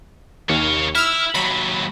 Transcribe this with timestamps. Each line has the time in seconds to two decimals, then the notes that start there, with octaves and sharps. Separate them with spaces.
0.49 D#2 C#5 F5
0.95 E4 E6 F6
1.35 D#2 F#3 B5